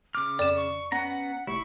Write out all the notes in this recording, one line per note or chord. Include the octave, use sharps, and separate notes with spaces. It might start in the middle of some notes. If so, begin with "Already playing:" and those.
C#3 D6 F6
F2 D5 E7
C#6
B3 C#4 F#5 A#5
F1 E4 C#6